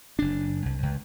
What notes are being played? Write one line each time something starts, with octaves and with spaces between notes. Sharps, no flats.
F#1 D4
C2
C#2